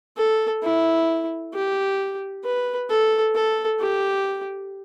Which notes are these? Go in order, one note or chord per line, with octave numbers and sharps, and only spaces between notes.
A4
E4
G4
B4
A4
A4
G4